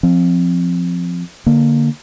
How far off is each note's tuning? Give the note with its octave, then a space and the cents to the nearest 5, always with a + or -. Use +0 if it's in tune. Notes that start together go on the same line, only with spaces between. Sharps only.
F3 +0 C4 +0
D3 +0 A#3 +0